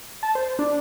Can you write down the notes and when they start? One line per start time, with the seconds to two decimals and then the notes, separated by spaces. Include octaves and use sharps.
0.23 A5
0.35 C5
0.59 D4